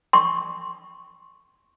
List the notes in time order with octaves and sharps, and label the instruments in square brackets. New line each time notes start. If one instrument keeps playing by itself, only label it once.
[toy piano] C6 C#6